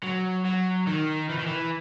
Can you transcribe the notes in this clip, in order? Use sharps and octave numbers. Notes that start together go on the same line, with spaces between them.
F#3
F#3
D#3
E3
D#3
E3